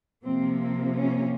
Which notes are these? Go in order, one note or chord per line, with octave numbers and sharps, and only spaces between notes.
C3 F3 A#3 C4
C4
C#4